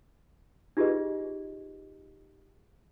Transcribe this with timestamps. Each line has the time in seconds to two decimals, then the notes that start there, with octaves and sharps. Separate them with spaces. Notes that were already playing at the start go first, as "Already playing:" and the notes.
0.77 D#4 F4 G4 G#4 B4 D#5